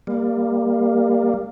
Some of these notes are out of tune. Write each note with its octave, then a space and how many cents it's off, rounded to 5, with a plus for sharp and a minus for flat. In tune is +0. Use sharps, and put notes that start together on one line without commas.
G3 +20 A#3 +0